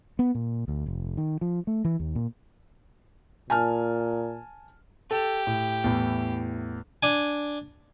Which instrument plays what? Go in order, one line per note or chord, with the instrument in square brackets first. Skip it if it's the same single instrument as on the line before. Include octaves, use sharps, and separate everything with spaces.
[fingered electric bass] B3
A#2
D2
F1
D#3
F3
A3
E3
D#2
A#2
[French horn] A#2 [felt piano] G#5 A5 F6
[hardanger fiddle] G4 [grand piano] A4
[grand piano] A2
E2 A2
[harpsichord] D4 G#5